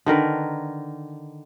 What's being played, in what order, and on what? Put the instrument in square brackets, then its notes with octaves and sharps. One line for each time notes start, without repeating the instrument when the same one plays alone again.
[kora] D3 D#3 A#4 B4